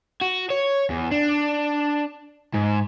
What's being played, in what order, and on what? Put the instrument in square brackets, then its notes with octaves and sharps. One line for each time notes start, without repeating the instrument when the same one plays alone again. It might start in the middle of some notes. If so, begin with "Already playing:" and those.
[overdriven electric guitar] F#4
C#5
E2
D4
G#2